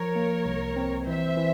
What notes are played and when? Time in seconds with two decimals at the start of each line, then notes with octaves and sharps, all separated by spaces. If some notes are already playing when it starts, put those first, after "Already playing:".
Already playing: F3 A#4 C#5
0.16 A#3
0.46 C2
0.76 C4
1.06 E3 C5 E5
1.37 E3